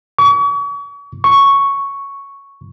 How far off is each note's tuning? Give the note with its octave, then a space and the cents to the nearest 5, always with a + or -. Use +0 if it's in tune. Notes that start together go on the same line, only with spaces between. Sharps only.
C#6 +40
C#6 +0